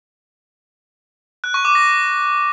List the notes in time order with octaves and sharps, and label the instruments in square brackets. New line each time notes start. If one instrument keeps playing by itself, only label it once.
[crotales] F#6
C#6
D6
A#6